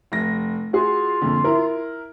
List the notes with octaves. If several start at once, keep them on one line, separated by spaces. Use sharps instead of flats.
F1 A#6
F4 F#4 G#4
F2 A#2 D3
E4 A#4